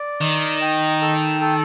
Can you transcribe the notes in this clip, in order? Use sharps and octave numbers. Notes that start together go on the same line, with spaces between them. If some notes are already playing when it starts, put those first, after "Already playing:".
Already playing: D5
D#3 D#5
G5
A4
A4